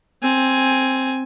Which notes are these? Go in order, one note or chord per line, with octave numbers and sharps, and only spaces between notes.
C4 G#5